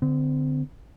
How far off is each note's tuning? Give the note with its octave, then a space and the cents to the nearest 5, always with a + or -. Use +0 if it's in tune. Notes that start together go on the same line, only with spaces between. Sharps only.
D3 +0 C4 -35